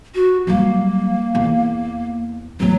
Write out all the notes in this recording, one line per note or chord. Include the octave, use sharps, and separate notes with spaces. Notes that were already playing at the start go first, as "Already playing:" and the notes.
F#4
F#3 G3 A#3
E2
F#3 A3 B3